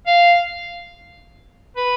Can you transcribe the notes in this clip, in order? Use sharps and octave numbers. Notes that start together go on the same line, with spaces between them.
F5
B4